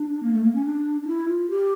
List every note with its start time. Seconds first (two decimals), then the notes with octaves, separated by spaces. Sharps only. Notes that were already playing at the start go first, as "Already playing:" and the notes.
Already playing: D4
0.23 A#3
0.33 A3
0.44 A#3
0.55 C#4
0.65 D4
1.01 D4
1.07 E4
1.28 F4
1.50 G4